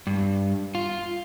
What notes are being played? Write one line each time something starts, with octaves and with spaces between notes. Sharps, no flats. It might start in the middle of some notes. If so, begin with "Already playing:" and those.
G2
F4